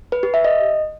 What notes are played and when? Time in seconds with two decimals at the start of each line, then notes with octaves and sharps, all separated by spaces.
0.12 B4
0.23 G4
0.34 E5
0.44 D#5